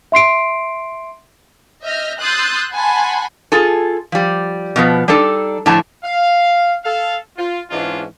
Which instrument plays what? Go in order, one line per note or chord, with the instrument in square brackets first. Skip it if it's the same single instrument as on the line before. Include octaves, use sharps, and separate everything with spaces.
[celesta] E5 C6 C7 D7
[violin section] D#5 E5 F6 G6 A#6
C6 D#6 E6 F#6 G6 A6
F#5 G#5 A5 B5 C6
[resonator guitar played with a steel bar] F4 G#4 A4
F3 G3
B2 F3 B3
G3 D4 D#4 A4
A2 D3 F3 A3 A5
[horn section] F5
A4 F5
F4
G#2 E3 G#3 C#4 D4 F4